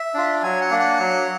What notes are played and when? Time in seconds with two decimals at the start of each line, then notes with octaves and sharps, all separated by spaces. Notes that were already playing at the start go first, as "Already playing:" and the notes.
Already playing: E5
0.14 D4 F4
0.43 F#3 G#5
0.61 F#5
0.71 A#3 D4
0.80 F#5
0.99 F#3